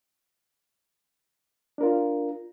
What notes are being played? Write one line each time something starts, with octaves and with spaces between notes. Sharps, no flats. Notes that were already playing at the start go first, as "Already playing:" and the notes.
D4 F4 A#4